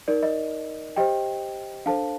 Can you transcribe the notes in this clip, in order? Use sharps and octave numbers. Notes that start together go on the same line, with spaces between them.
D#4 A#4 D5
D#5
G4 C5 D#5 G5
D4 A4 C5 F5 A5